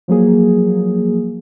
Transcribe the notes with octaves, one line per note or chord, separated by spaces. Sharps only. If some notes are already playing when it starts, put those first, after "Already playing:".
F3 F#3 A#3 G#4